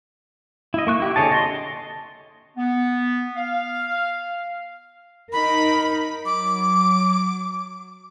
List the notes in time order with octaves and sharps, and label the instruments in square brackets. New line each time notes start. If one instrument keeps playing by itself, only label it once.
[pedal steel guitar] E4 D#5
A#3 C#6 F#6
E4 G4
D3 G#4 C#5 D#5 A5
D#5 C6
[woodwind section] B3
F5
[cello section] D#4 A#4 [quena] B5
[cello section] F#3 [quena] D6